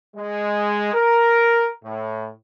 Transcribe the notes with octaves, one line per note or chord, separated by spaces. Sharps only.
G#3
A#4
A2